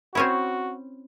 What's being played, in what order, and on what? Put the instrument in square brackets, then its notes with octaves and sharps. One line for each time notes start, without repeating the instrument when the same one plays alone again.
[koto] C4 C#4 E4 [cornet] F#4